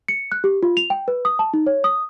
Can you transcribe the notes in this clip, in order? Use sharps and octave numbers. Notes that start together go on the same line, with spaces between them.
C#7
F#6
G4
F4
F7
G5
B4
D#6
A5
D#4
C#5
D#6